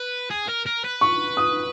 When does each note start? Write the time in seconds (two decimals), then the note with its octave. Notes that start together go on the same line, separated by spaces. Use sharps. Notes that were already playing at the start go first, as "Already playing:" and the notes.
Already playing: B4
0.30 G#4
0.48 A#4
0.66 A#4
0.84 B4
1.01 C#6
1.37 D#6